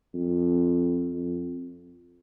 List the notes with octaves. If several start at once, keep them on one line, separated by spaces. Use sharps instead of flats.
F2
F2